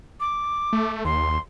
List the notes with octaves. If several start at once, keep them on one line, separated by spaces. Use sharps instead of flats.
D6
A3
D#2 C6